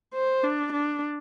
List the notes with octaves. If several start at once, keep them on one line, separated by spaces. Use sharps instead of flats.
C5
D4
D4